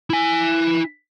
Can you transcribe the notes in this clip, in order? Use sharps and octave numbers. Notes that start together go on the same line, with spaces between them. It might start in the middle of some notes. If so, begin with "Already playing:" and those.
E4 G#5